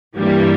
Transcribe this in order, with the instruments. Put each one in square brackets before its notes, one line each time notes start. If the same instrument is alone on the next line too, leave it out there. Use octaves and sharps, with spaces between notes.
[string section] G2 E3 G3 A#3